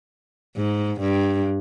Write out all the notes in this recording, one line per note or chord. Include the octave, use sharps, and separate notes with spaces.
G#2
G2